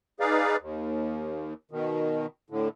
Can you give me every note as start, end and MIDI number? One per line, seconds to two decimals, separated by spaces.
0.20 0.56 63
0.20 0.56 68
0.20 0.56 71
0.20 0.56 74
0.20 0.56 77
0.60 1.54 39
1.71 2.26 47
1.71 2.26 51
2.50 2.69 45
2.50 2.69 50